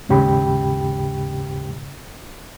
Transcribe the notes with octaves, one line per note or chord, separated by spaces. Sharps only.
D#2 G#2 C#3 G4 G5 B5